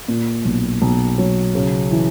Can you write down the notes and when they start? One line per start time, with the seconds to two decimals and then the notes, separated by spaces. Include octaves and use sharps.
0.08 A#2
0.45 B1
0.82 B1
1.18 F#3
1.55 C#3
1.91 E3